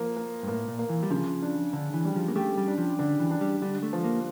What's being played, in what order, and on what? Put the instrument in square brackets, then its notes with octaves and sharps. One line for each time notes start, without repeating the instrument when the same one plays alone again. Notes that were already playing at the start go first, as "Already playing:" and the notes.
Already playing: [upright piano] F3 A#3
A#3
[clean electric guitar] G2
[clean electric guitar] A2 [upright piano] A#3
[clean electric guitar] A#2
[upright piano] A#3
[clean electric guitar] E3
G3
[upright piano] C#3 [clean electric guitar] F3
[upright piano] D4
[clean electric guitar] D3 [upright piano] D4
[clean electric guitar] E3
[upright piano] G3
[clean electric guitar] F3
A#3
[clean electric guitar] A3 [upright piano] G4
[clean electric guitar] G3
[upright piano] D4
[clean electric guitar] F3
[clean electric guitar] D3 [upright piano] D4
[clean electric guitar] E3
[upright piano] D4
[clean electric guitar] G3
[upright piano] D3 [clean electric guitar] G3
[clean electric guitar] A3
[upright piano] F3
[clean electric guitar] A#3